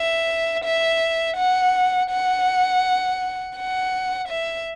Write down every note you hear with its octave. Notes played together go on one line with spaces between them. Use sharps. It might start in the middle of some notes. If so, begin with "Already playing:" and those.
Already playing: E5
E5
F#5
F#5
F#5
E5